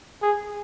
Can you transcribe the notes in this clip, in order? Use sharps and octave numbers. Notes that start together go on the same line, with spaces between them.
G#4